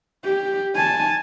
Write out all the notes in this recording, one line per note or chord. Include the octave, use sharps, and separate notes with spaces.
G4
G#5 A5